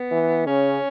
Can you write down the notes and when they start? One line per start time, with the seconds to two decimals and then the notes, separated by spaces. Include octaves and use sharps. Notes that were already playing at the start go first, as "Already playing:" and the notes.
Already playing: B3
0.11 E3
0.47 C#3 C#4